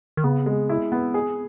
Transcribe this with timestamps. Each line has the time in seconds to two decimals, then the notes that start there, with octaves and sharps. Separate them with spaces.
0.17 D#3
0.24 C#3 B3
0.46 G#3
0.69 E4
0.92 B3
1.14 G#4